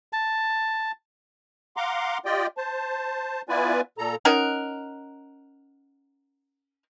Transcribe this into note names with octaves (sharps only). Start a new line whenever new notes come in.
A5
F5 F#5 A#5 C6 D6
F4 G4 D5 D#5 G5
C5 A5
B3 E4 F4 B4 D5 G#5
A#2 A4 A#5
C#4 D#4 A#4 F#5